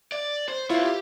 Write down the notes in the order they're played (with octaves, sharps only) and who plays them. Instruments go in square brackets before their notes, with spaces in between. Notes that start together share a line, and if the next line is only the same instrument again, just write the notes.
[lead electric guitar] D5
C5
[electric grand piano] E4 F4 [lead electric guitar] B4 C#5
[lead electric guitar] G4